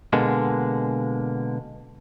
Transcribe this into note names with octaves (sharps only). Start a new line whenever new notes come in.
B2 D3 G#3 A#3